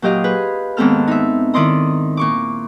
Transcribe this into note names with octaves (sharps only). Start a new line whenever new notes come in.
A#2 F#3 G4 D#5 F5
G#4 B4
D#2 G#2 B3 C4 A4 F6
D#4 E5
D#3 E4 D5 D#5 C6 D#6
A#2 C#6 D6